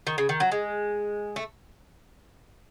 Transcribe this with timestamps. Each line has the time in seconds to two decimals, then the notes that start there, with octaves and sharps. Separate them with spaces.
0.07 D#3
0.18 C#3
0.29 D#3
0.40 F#3
0.52 G#3
1.36 A3